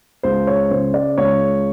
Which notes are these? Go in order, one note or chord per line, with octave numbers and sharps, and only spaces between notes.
C#2 C5
C#5
C#3 C5
D5
C#2 C#5